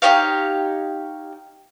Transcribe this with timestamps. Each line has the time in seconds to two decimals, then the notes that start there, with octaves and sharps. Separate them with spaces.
0.02 D#4 G4 C#5 F5